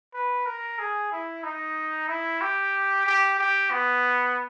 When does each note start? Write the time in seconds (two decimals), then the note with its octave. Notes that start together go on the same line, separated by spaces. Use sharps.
0.14 B4
0.46 A#4
0.79 G#4
1.12 E4
1.44 D#4
2.09 E4
2.41 G4
3.06 G4
3.39 G4
3.71 B3